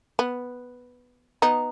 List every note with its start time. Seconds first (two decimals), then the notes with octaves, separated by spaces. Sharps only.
0.19 B3
1.42 B3 D#4